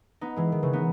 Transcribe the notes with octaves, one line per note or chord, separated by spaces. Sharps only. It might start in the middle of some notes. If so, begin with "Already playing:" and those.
B3 D#4
E3 G#3
D#3
C#3 E3
B3 D#4